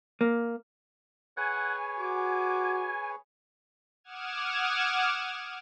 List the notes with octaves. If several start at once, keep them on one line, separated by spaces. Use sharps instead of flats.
A#3
G#4 B4 C#5 F#5 G#5
F#4 D6
F#5 D6 D#6 F6 G#6 E7